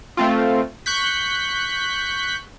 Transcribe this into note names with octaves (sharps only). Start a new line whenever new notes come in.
A3 C4 F4
C#6 F#6 G6 B6